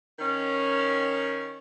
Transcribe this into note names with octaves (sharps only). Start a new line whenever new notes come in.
D#3 C#4